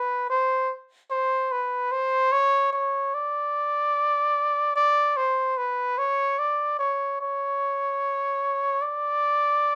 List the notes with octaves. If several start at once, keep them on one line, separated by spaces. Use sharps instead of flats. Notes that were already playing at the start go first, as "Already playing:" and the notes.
Already playing: B4
C5
C5
B4
C5
C#5
C#5
D5
D5
C5
B4
C#5
D5
C#5
C#5
D5